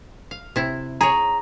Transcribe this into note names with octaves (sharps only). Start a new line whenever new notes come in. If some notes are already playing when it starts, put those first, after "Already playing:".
F5
C3 E4
G#4 C#5 A#5